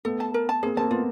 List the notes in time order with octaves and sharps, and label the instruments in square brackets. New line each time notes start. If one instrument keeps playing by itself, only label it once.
[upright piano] A3 B3 [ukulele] A4
[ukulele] A5
A#4
A5
[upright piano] A#3 C4 [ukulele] G#4
[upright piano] A#3 C4 [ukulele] A5
[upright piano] A3 B3 [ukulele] F4